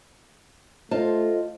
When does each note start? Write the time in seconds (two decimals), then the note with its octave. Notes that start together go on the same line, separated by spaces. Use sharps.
0.91 A3 F4 C5 D#5 A5